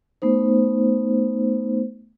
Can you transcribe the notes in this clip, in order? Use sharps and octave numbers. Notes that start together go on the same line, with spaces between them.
A3 B3 D#4 C5